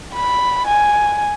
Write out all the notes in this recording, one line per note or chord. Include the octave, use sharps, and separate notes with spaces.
B5
G#5